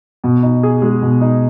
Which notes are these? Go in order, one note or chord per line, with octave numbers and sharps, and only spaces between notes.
B2
D#4
G#4
G#3
B2
D#4